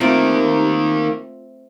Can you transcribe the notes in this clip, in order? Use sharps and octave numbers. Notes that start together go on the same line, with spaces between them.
D#3 A3 A#3 C4 F4